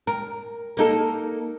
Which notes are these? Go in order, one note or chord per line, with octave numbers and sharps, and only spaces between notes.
A#4
A#3 D#4 A4